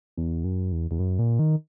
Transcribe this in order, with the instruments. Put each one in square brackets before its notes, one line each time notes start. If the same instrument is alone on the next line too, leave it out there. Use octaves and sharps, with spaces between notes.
[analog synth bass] E2
F#2
E2
E2
F#2
A#2
D#3